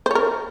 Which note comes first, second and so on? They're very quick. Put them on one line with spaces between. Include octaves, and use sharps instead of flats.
C5 C#5 A#4